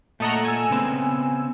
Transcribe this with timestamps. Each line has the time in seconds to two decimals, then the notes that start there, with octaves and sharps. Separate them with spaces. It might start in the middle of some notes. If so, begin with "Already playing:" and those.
0.20 A#2 A3 A4 D#5 F#5 A#5
0.45 G#5 E6
0.70 C#3 B3 C4